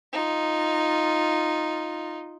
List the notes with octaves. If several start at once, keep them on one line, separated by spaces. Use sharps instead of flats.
D#4 F4